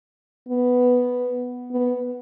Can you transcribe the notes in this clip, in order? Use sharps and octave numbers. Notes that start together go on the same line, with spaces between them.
B3
B3